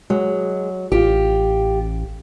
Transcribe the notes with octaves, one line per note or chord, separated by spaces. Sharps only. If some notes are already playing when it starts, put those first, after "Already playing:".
F#3 G#3
A1 F4 G4